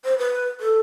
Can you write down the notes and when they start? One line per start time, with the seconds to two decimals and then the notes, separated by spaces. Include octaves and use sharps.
0.05 C5
0.18 B4
0.60 A4